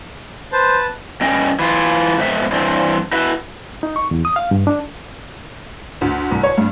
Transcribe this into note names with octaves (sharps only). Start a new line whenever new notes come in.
B4 C5 A5
G2 C#4 D#5 G5
E3 F4
F2 G#2 B3 E5
G2 E3 C4 D4
E4 F#4 B4 E5
D#4
C#6
E2
D#6
F5
G2
D4
D2
C2
C#5
G2